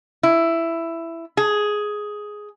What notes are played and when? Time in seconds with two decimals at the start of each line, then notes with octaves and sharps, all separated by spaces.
0.23 E4
1.37 G#4